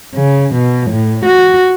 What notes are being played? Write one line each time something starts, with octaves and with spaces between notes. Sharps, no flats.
C#3
B2
A2
F#4